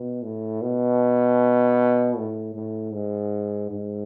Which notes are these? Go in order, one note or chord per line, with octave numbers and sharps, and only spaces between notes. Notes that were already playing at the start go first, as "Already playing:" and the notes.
Already playing: B2
A2
B2
A2
A2
G#2
G#2